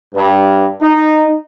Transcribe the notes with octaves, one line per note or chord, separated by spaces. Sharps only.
G2
D#4